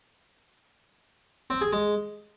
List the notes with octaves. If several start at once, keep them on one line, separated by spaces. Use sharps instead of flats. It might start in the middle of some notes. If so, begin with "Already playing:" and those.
C4
G#4
G#3